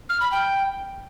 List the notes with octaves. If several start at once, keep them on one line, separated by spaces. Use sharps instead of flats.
F6
B5
G5